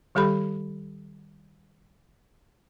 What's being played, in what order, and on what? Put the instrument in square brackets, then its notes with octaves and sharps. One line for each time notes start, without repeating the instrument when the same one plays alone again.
[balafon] D#3 G3 G4 A4 B5